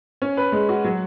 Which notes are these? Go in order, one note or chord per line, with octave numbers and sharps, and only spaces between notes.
C#4
B4
G#3
F#4
F#3